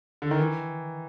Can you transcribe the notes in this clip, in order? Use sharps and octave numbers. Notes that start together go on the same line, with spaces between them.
D3
D#3
E3